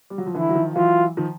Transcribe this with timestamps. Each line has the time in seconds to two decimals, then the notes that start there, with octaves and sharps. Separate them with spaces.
0.10 G3
0.18 F#3
0.26 F3
0.35 D3 E3 E4
0.49 F#3
0.55 D#3 F3
0.76 E3 F#3 F4
1.17 D#3 F3